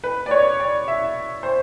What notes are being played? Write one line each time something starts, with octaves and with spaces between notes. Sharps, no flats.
B4
D5
C#5
D5
E5
C5